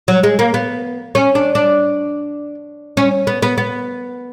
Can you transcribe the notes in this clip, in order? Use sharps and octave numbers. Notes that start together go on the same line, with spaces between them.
F#3
G#3
A#3
B3
C#4
D4
D4
C#4
B3
B3
B3